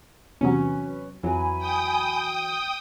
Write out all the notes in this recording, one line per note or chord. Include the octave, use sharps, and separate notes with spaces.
E2 C3 F#3 C#4 B4
F2 E3 F#3 G#5 B5
G5 D#6